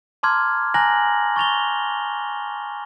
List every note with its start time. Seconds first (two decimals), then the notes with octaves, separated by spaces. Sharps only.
0.23 A5 A#5 C6 D6 F6 G#6
0.74 G#5 A#5 F#6 A#6 F#7
1.36 C#6 A6 F7 G7